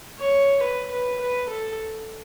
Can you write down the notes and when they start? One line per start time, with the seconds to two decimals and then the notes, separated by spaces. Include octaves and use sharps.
0.19 C#5
0.62 B4
0.91 B4
1.21 B4
1.49 A4